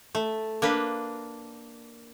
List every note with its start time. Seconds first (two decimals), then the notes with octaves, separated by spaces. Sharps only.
0.15 A3
0.62 A#3 D4 B4